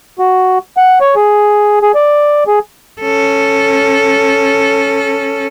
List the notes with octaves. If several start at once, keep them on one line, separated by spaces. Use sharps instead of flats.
F#4
F#5
C#5
G#4
G#4
D5
G#4
C#4 A4